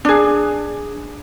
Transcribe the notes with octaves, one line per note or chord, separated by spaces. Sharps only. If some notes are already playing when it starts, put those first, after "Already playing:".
D4 G#4